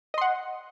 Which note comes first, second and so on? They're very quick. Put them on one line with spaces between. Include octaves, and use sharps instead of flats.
D#5 C6 F#5